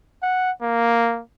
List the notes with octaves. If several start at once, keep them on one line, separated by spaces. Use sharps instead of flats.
F#5
A#3